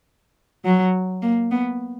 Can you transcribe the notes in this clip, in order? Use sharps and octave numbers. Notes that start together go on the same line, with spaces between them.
F#3
A#3
B3